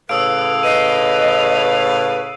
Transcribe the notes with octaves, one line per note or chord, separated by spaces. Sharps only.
A2 C#3 B4 F5 D#6 E6 D7
B4 D#5 C7 D#7